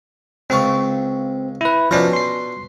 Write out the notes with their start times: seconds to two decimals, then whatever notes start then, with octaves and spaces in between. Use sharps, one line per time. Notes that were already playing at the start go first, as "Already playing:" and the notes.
0.50 C#2 C4 F4 C#6
1.61 E4 B4
1.91 B2 F3 C#4 D4 A#5
2.13 C6 C7